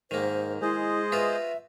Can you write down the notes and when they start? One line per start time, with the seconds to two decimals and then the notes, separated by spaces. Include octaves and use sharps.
0.11 G#2 D#3 A#3 C5
0.62 G#3 E4 G#4 C5 D#5
1.12 B3 F4 F#4 E5